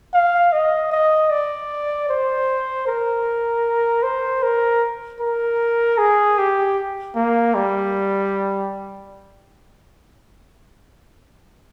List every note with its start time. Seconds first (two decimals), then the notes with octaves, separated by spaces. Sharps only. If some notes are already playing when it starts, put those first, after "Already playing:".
0.14 F5
0.53 D#5
0.92 D#5
1.30 D5
2.09 C5
2.87 A#4
4.03 C5
4.43 A#4
5.20 A#4
5.98 G#4
6.38 G4
7.15 A#3
7.55 G3